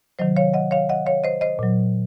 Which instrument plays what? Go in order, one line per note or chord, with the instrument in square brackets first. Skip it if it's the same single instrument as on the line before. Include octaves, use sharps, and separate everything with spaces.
[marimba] C3 D#3 F#3 C5 D#5
C#5 F5
D#5 F#5
C#5 F5
D#5 F#5
C#5 F5
C5 D#5
C5 D#5
A#2 F#3